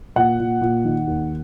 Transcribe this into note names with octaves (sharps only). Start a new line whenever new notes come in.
A#2 F#5
A#2
A#2
D#3
D#2